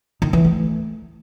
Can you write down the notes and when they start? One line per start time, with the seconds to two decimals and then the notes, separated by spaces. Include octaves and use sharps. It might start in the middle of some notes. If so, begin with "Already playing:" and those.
0.22 D#3
0.33 E3
0.45 A3